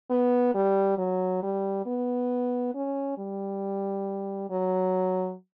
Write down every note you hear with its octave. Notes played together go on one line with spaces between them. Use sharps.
B3
G3
F#3
G3
B3
C#4
G3
F#3